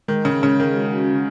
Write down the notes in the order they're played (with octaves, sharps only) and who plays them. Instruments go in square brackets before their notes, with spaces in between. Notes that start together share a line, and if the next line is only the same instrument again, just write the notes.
[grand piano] D#3 [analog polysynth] G#3
[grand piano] C#3
[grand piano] C#3 [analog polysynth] C#4
[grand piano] D#3
[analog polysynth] F#4
C#3